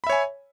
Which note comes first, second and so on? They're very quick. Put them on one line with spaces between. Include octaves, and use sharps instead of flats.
B5 E5 C#5 G#5